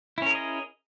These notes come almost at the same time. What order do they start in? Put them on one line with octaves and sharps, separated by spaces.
E4 C#4 A#4 G#4 D#5